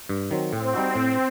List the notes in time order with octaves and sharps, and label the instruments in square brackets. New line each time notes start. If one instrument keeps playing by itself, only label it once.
[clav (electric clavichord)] G2
D#3 F#3 C4
[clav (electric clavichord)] A2 [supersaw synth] C4
[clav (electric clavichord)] G3 D#4 F#4
A2